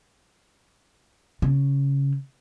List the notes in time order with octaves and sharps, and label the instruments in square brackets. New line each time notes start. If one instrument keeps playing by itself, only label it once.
[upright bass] C#3